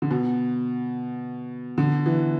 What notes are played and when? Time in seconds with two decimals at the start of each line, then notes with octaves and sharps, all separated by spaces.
0.02 D3
0.11 B2
1.78 D3
2.06 E3